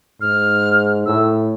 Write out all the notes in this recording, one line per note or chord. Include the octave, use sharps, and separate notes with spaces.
G#2 F6
A2 E6